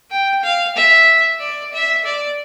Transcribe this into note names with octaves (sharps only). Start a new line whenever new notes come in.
G5
F5
E5
D5
E5
D5